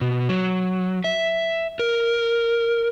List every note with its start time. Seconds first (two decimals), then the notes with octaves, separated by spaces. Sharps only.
0.01 B2
0.29 F#3
1.04 E5
1.79 A#4